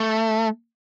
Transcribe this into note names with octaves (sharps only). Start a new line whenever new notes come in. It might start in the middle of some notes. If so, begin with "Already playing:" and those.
Already playing: A3